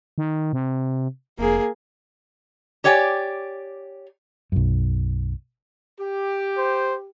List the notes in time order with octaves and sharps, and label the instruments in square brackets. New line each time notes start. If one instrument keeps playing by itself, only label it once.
[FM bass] D#3
C3
[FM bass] F1 [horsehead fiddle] A#3 G#4
[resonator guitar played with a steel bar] G4 C#5 D5 G5 G#5
[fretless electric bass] B1 F#2
[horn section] G4
[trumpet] C5